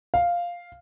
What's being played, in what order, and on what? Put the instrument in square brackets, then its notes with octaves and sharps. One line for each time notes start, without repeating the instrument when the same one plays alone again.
[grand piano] F5